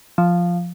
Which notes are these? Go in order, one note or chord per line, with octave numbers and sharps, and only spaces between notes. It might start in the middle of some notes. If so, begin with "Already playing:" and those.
F3